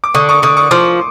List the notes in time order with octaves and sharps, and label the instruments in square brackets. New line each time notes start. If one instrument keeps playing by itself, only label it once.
[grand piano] D6
[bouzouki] D3 [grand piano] C#6 D#6
[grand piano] C#6 D#6
[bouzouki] D3 [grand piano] C#6 D#6
[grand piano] C#6 D#6
[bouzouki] F3 [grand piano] C6 D6